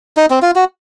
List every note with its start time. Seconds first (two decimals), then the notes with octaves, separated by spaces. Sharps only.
0.17 D#4
0.30 C4
0.42 F4
0.56 F#4